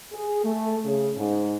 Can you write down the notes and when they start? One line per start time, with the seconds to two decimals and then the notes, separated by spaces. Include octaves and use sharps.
0.13 G#4
0.43 A3
0.85 C#3
1.17 G#2